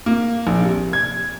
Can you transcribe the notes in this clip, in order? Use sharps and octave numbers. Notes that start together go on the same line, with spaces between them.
A#3
A#1
C3
G#6